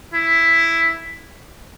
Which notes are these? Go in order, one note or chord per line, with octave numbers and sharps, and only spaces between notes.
E4